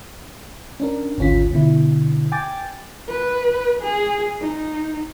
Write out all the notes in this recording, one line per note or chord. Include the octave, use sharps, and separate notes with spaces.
C#4 D4 A#4
G#1 D2 C#4 F4 B6
B2 D3 E4
G5 G#5 D6 A6
B4
G#4
D#4